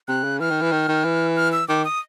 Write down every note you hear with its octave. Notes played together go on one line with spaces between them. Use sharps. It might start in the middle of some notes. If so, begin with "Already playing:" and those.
C3 F#6
C#3
E3 F6
D#3
E3
D#3
D#3
E3
F6
E6
D#3 D6
D#6